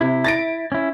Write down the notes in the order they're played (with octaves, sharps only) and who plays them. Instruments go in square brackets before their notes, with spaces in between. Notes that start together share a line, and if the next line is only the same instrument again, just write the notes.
[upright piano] C3 [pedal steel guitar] E4
[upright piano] A6 A#6 D7
[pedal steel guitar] C#4 E4